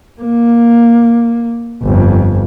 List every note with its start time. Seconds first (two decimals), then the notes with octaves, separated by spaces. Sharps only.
0.21 A#3
1.82 G1 F2